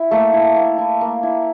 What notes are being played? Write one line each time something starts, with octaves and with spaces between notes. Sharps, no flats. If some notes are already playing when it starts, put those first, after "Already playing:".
Already playing: E4
A3 A#3 A4
E4
A#3
E4
A#3
E4